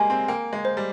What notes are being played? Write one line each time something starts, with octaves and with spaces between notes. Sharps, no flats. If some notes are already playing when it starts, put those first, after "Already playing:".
Already playing: G3 G#3 A#3 G#5
C4
A#3 G5
G#3
C5
G3